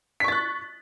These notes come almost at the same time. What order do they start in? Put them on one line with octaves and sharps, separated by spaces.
B6 C#6 A6 F#6